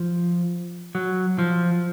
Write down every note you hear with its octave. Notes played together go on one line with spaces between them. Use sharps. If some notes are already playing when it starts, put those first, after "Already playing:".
Already playing: F3
F#3
F3